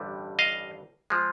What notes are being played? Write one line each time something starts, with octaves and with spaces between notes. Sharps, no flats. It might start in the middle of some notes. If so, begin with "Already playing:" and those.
Already playing: A1 G2 D3 G3
D#5 F5
F3 G#3